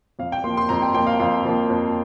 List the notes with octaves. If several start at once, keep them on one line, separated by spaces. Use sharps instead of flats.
F2 F5
G5
F3 A#3 C6
C6
F2 A#5
G5
F3 A#3 G5
F5
F2 F5
F3 A#3
F2